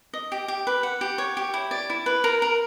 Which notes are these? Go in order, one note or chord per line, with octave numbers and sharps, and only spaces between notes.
D#5
G4
G4
B4
F#5
G4
C#5
G4
E4
D5
E4
B4
A#4
A#4